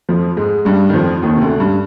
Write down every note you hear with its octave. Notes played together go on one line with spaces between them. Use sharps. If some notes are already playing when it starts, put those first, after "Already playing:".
F2 F3
G#2 G#3
G2 G3
D#3
F2 F3
D#2 D#3
C3
D2 D3
G2